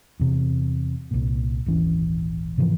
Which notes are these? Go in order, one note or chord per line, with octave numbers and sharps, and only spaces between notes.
E2 C3
C2 A#2
D#1 G#1 E3 C#4
G#2 C3 E3 F3